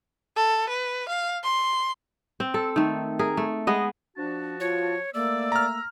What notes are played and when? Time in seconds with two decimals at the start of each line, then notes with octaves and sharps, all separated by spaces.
0.37 A4
0.69 B4
1.09 F5
1.44 C6
2.40 C4
2.54 A4
2.76 D#3 A3
3.19 G#4 A#4
3.37 A3
3.67 G#3 B3 D#5
4.17 F3 D4 F#4 A5
4.60 F4 C#5
5.14 A3 A#3 D5 E6
5.52 A#5 F6